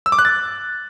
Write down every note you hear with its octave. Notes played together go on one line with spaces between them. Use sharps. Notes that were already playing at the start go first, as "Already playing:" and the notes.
E6
D6
F#6
A6